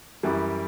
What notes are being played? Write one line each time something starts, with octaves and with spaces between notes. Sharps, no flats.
F#2 E3 G3